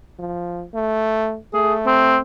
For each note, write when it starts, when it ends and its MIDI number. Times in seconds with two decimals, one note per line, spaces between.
0.19 0.64 53
0.74 1.38 57
1.54 2.20 57
1.54 1.74 68
1.87 2.17 60